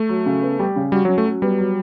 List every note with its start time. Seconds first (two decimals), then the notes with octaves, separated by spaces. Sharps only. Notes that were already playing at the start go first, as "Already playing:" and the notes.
Already playing: A3
0.09 F#3
0.26 C#3
0.42 B3
0.59 G3
0.76 C#3
0.92 G3 F#4
1.05 F#3 C#4
1.18 A3
1.25 F#3
1.42 G3 B3
1.58 F#3